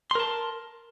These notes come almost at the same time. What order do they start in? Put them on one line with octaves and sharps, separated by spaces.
C6 A#4 A5